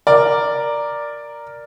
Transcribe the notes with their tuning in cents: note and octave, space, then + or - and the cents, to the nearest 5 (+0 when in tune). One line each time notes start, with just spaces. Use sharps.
A#4 +0 D5 +0